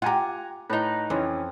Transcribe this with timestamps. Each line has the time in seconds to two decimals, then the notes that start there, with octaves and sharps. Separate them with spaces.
0.02 F4 G4 F#5 G#5 A#5
0.70 A2 D#4 B4
1.10 F2 E3 F3 C#4